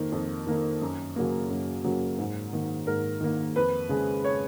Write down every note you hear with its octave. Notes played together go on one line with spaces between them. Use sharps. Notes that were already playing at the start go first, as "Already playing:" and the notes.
Already playing: F2 D#3 A#3
F2
D#3 A#3
F#2
C#3 F#3 A#3
F#2
C#3 F#3 A#3
G#2
D#3 A#3
G#2 A#4
D#3 A#3
F2 B4
C#3 G#3
C#5